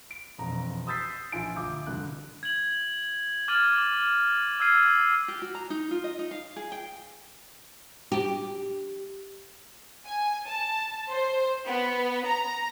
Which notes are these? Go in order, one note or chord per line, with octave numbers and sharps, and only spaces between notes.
D7
E1 F2 A#5
D#6 E6 G6 A6 B6 C7
A#1 F4 G#5 D7
D2 D6 G6
F1 G2 D3 F#6
G#6 F#7
D6 F6 G#6 A6 D#7 F#7
D6
E6 F6 G#6 C7 D#7
G4
F#4
A#5
D#4
F4
D#5
D#4
F5
G#4
G5
G4
G#5
A5
C5
B3
A#5